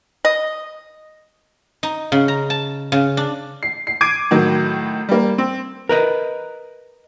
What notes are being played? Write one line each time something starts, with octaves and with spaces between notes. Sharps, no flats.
D#5
D#4
C#3
A#5
A5
C#3
D4
C7
C7
D6 G#6 C7 D7 D#7
A2 D#3 F#3
G3 A#3
C4
A#4 B4 D#5